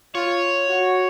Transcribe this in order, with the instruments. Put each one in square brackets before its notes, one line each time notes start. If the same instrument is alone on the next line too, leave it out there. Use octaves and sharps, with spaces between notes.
[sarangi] F4 [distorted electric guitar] C#5
[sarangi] F#4